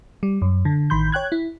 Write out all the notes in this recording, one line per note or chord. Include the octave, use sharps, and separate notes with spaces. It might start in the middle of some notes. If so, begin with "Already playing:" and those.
G3
F#2
D3
A1 D#3 B5 C6 G6
C#5 G5 F#6 G#6
E4